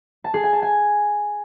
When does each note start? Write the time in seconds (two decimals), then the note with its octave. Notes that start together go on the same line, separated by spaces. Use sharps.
0.24 A5
0.34 G#4
0.43 G#5
0.53 A5
0.62 G#5